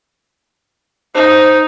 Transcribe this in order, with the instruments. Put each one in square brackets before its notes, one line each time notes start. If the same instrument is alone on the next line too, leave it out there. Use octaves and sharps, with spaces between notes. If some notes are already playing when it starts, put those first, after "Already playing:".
[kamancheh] D#4 [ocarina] C5